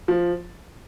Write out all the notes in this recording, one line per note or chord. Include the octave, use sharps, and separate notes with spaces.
F3